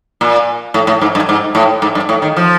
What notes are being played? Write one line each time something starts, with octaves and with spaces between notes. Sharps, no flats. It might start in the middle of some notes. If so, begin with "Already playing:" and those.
A#2
A2
A2
G#2
G2
G#2
A2
G#2
G2
A2
D#3
F3